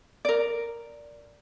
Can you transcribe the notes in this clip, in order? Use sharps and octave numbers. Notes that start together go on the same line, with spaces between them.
A#4 D5